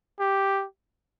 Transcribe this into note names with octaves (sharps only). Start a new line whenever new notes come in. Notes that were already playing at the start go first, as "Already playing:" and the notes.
G4